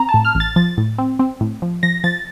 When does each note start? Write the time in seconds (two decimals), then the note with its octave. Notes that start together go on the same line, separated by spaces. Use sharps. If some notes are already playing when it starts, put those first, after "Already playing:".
Already playing: C4 A#5
0.09 A5
0.14 A2
0.25 F6
0.35 A1
0.40 A6
0.56 F3 A6
0.78 A2
0.98 C4
1.19 C4
1.41 A2
1.62 F3
1.83 F3 A#6
2.04 F3 A6